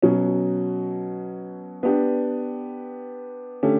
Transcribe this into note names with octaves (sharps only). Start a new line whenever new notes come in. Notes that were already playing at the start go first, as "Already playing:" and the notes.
B2 F#3 C#4
B3 D4 G4
D3 A3 C#4 G4